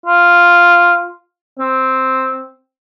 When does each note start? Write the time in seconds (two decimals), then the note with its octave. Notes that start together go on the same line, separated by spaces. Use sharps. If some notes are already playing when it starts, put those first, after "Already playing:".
0.06 F4
1.59 C4